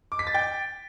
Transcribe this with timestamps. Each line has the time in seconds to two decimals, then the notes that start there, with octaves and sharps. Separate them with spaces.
0.12 D6
0.19 B6
0.27 A6
0.34 G5